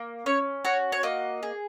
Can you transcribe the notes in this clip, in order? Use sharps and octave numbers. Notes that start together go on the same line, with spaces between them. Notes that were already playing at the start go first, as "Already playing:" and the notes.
Already playing: A#3
C#4 C#5
F#4 C#5
C#5
A#3 D#5
G#4